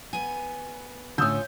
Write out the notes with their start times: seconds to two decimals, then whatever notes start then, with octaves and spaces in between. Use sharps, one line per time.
0.13 B3 G#5 D#7
1.18 A2 D3 C#4 F4 D#6 E6 G6